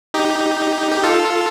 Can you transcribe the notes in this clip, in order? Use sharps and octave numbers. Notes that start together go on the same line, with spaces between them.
D#4 G4
G4
F4 A4